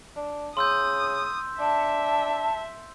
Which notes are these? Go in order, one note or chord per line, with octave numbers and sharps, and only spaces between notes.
D4
C#3 C6 D#6 E6 G6
D4 E5 A5